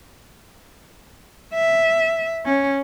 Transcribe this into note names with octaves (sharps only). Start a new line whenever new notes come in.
E5
C#4